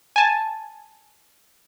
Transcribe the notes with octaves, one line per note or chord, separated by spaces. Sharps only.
G#5 A5